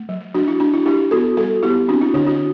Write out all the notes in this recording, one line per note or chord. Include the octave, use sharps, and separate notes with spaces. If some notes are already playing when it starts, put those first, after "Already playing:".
Already playing: A3
F#3
F#3 D4 F#4
E4
F#3 D4 F#4
E4
D4 E4 G4
B3 F#4 A4
G3 F#4 A4
B3 E4 G4
C4 D4 F#4
E4
D3 D4 F#4
D4 F#4